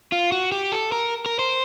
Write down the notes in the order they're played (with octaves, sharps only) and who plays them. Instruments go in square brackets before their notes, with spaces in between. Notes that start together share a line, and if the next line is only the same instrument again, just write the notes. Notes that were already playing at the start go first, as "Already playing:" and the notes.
[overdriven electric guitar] F4
F#4
G4
A4
A#4
A#4
C5